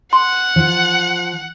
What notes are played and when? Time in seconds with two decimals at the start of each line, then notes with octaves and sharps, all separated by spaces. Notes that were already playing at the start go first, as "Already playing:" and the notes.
0.13 F#5 C6
0.56 F3